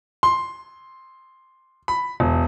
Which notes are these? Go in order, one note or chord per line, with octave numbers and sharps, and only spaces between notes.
C6
B5
E1